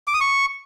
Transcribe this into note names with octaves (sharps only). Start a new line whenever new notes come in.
D6
D#6
C#6